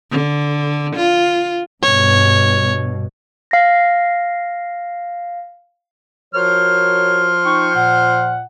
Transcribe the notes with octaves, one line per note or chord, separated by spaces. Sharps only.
D3
F4
G2 B2 C#5
F5 A#6
F3 F#4 A#4 C5 C#5 F6
D#4 G5 C#6
A#2 F#5